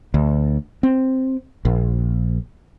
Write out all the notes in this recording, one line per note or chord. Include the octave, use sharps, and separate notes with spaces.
D2
C4
A#1